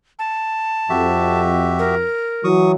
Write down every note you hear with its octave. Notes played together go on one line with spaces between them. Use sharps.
A5
F2 F#4 G4 E5
A#4
E3 F#3 C#6 D#6